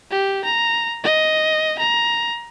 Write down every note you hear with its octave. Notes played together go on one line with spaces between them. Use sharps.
G4
A#5
D#5
A#5